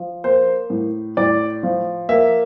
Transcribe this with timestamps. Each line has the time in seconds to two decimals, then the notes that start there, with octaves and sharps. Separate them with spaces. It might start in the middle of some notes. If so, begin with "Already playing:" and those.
Already playing: F3
0.24 A#3 C5
0.70 A2
1.17 A2 D5
1.63 F3
2.09 A#3 E5